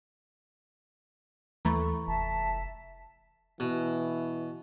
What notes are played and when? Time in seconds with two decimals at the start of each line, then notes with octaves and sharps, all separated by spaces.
1.65 D#2 E3 A3 A#5 B5 C#6
2.07 F1 E5 A5
3.60 B2 E3